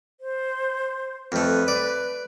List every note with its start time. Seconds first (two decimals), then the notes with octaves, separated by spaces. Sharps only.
0.20 C5
1.32 F2 A3 B4
1.68 D5